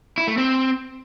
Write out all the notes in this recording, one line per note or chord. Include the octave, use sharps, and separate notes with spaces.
E4
A3
C4